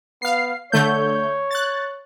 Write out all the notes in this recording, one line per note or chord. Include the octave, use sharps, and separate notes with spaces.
B3 F5 C7
D3 A3 C#5 G6
F#6 A6